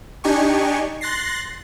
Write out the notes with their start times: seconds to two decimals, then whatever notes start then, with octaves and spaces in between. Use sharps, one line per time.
0.24 D4 D#4 G4 G#5 C#6
1.01 C6 F#6 A6 A#6 C7